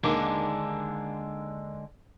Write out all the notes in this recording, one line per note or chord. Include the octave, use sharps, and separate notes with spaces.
D#2 D3 G#3 A#3 D4 D6